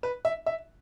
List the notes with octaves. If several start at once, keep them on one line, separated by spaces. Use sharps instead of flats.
B4
E5
E5